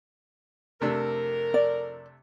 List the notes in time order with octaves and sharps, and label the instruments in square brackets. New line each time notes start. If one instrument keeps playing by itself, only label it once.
[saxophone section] F2 A#4 [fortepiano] C3 A3 D4
[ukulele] D5